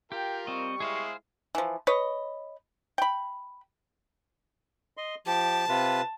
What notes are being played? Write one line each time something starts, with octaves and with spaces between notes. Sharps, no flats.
F4 G4 A#4 G5
G3 C4 D#5 C#6
G#3 E4 G#4 C5 D#5 F5
E3 F3
B4 C#5 D#5
G5 B5
D#5 C6
F3 G4 A5
C3 F4 B4